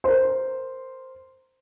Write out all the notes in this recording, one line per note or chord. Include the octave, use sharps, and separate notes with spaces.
A#4 C5